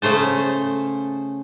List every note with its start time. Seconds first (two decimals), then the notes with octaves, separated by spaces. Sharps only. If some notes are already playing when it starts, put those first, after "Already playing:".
0.02 C#3 A3 C5 A5